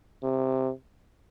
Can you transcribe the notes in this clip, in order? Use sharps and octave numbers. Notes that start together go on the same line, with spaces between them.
C3